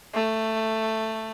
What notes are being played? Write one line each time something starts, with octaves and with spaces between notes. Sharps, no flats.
A3